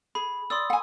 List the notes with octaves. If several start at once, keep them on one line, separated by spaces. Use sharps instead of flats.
G#4 B5
D5 C6 D#6 E6
F#5 G#5